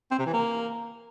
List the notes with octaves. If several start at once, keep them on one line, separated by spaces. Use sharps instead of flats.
C4
C3
E3
A#3